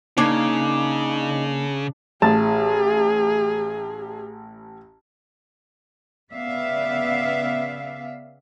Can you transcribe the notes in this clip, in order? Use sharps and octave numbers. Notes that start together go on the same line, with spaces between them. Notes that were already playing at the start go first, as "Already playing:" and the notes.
C#3 A#3 D4 D#4 F5 G#5
A1 G#4 A5
C#3 B3 D5 E5 F5